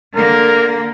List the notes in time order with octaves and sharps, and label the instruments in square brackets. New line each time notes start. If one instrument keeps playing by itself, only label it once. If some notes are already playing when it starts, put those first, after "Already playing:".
[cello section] D3 A#3 [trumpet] A#4